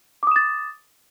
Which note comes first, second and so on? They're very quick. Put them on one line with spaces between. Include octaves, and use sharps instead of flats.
D6 D#6 E7 A6